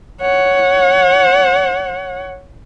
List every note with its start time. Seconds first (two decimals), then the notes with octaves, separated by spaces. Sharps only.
0.21 C#5 F#5